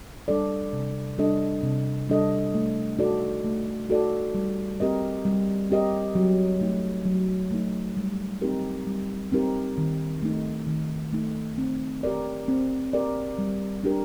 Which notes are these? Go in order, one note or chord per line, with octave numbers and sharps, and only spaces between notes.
G3 D4 A4 D5
C3
G3 D4 A4 D#5
C3
G3 D4 A4 D#5
A3
D#4 F#4 A4 D5
A3
D#4 F#4 A4 D5
G3
C4 G4 A#4 D#5
G3
C4 G4 A#4 D#5
F#3
A3 D#4
F#3
A3 D#4
G3
C4 D#4 G4 A#4
G3
C4 D#4 G4 A#4
D#3
A3 D#4
D#3
A3 D#4
C4
G4 A#4 D5
C4
G4 A#4 D5
G3
D4 G4 A#4